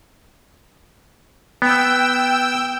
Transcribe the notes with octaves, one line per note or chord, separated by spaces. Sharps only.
B3 G5 E6